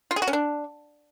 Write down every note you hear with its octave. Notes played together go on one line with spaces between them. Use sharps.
F4
G#4
F#4
C#4
D4